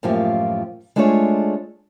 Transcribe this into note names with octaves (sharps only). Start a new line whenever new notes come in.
F#2 A2 F3 A#3 F4 G4
G#3 A3 D4 F4 G#4 C#5